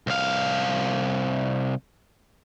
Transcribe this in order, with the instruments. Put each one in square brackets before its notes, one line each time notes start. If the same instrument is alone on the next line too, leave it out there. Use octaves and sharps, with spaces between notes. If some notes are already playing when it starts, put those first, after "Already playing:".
[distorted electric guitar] C2 F5